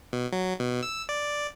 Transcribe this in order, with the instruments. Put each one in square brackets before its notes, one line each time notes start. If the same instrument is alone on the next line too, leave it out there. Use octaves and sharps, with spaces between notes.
[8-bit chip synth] B2
F#3
B2
E6
D5